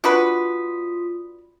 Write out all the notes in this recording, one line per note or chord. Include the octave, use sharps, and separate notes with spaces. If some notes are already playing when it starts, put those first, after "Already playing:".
D4 F4 F#4 B4 D#6 B6